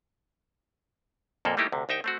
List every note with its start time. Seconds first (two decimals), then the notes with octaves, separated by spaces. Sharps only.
1.45 F2 A#2 A#3 A4
1.57 G3 A3 A#3 D#4 E4 G4
1.72 D2 C3
1.89 C2 D#4 E5 G5
2.04 A3 C4 F#4